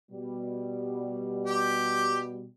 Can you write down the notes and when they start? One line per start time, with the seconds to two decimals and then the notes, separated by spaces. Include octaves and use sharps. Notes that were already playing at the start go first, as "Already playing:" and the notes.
0.11 B2 G3
1.47 G4